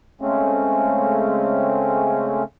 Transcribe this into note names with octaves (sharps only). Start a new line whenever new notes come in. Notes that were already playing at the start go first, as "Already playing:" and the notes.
C#3 G#3 A3 C4 C#4